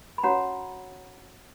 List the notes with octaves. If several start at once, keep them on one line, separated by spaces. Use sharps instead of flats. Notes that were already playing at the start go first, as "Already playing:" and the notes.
B5
C#4 F#4 C#5 F#5 A#5